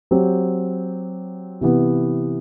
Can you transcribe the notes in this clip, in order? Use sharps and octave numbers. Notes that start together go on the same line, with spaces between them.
F#3 C4 G4
C3 E3 B3